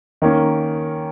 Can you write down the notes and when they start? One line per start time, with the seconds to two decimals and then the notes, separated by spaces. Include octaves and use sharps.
0.22 D#3 A#3 C#4